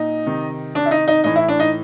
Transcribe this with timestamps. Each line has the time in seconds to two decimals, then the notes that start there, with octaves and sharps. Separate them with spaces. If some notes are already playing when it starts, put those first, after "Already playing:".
Already playing: A#2 D#4
0.26 C3 D#3
0.75 D4
0.86 E4
0.91 D#4
1.08 D#4
1.24 A2 E3 D#4
1.36 E4
1.49 D4
1.60 D#4